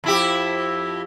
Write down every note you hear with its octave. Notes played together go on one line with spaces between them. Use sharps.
F2 E4 G4